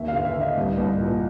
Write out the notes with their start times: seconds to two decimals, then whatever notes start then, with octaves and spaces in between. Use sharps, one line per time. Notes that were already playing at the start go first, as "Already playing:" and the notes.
Already playing: D#2 E5
0.08 F5
0.14 D3
0.24 E5
0.35 D3
0.41 D#5
0.57 C2
0.78 C2
1.00 A#2